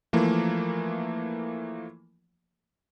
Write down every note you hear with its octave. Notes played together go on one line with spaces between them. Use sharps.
E3 F3 A3 A#3